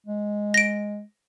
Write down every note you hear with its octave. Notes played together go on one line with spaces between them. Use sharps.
G#3
A#6 D7